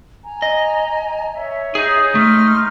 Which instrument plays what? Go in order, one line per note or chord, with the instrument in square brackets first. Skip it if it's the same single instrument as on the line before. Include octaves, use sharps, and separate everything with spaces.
[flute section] G#5 A#5
[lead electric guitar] D#5
[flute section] C#5 E5
[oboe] D#4 [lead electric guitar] G#4
[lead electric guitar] A3 [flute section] C6 F6